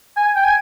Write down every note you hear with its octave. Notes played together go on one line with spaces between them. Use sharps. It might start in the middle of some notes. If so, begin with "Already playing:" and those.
G#5
G5
G#5